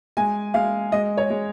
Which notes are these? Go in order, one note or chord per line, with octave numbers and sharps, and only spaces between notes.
G#3 G#5
G#3 F5
G#3 D#5
C#5
G#3